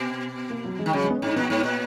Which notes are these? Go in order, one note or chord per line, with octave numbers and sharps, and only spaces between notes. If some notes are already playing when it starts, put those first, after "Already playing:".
Already playing: B2 B3
A#3
F#3
G#3
D#3
C#3 F#3
G#3
B3
C#4
G#2 D#4
A#2 B3
G#2
A#2